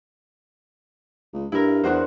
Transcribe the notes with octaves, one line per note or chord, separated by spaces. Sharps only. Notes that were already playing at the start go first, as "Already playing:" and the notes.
C#2
G2 E4 A#4
E2 D4 F#4 C5